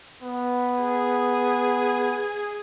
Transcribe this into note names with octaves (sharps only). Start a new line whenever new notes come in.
B3
G#4